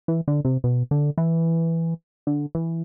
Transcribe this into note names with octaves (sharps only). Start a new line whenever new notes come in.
E3
D3
C3
B2
D3
E3
D3
E3